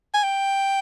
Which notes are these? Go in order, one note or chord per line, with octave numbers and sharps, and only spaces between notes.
G#5
G5